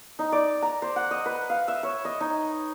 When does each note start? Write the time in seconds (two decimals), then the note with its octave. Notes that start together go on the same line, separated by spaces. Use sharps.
0.19 D#4
0.32 D5
0.62 A#5
0.82 C5
0.96 F#5
1.11 D#5
1.26 B4
1.50 F5
1.68 E5
1.83 C#5
2.05 D#5
2.21 D#4